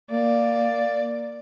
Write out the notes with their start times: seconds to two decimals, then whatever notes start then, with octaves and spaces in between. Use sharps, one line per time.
0.11 A#3 D5